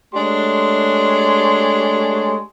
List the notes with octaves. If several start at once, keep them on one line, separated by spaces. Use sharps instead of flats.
G#3 A3 D4 G4 C#5 C6